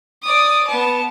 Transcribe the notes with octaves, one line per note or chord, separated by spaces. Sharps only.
D5 D#6
B3 A5